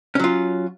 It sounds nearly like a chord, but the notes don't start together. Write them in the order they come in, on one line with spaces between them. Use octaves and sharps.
C#4 F#3 F4